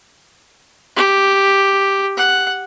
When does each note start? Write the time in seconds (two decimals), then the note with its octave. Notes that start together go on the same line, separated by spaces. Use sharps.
0.96 G4
2.17 F#5